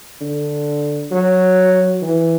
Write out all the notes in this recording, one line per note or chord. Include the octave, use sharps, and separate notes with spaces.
D3
F#3
E3